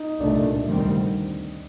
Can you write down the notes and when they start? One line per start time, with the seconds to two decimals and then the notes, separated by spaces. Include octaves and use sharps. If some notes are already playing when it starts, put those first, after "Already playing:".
Already playing: D#4
0.20 C2 A#2 A3 D4 D5
0.66 D2 C3 D#3 G3 C4